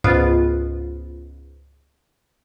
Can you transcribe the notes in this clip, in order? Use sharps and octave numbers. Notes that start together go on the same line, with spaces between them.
C#2 G#2 B3 F4